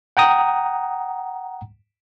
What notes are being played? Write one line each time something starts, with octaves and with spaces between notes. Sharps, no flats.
F#5 G5 A#5 D#6